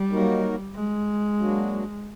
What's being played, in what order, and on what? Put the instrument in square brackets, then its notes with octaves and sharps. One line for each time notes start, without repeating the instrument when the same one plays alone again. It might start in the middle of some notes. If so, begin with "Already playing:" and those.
Already playing: [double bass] G3
[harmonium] F#3 A#3 D#4 F#4 A#4
[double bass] G#3
[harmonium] F#3 A#3 D4 F#4